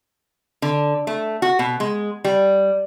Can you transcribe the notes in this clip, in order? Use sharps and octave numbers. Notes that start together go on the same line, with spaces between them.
D3
A3
F#4
B2
G#3
G3